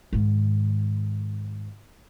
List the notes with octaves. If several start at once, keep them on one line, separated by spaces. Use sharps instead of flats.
G#2 D#3